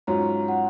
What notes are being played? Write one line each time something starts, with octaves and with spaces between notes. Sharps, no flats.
G#2 F#3 C#4 F4 A#5
F#5